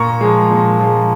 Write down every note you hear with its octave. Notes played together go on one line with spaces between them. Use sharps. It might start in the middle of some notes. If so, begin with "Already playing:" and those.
Already playing: A#2 A#5 C#6
F3 G#3
A#2
F3 G#3